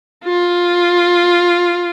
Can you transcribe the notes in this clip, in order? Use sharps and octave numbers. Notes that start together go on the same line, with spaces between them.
F4